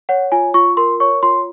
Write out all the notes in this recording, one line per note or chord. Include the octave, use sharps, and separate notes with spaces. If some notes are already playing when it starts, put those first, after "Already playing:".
C#5 F#5
F4 G#5
F4 C#6
A#4 C6
C#5 C#6
F4 C6